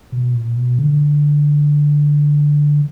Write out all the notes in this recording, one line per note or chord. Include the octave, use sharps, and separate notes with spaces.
B2
A#2
B2
D3